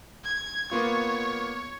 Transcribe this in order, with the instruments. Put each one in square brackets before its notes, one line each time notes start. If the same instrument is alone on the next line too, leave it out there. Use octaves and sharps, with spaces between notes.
[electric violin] G#6
[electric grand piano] A#3 B3 F4 [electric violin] C#5